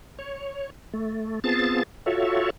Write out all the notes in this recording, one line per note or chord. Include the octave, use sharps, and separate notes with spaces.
C#5
A3
B3 C4 F4 G#4 A5 A6
F4 F#4 A4 C#5 E5